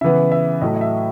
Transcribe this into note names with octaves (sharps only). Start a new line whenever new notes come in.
C#3 E3 B3 E5
E5
A2 F#3 A3 D#5
D#5
E5